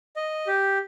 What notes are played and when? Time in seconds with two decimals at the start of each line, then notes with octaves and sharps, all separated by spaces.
0.16 D#5
0.47 G4